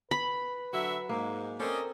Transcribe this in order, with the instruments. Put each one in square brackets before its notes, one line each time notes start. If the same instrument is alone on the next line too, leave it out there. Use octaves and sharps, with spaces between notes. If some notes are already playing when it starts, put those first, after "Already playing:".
[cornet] B4 [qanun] B5
[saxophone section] D3 F#4 E5 [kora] F#3
[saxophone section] G#2 [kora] A#3
[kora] C4 A4 C5 [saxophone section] C#4 D5 D#5 [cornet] A#4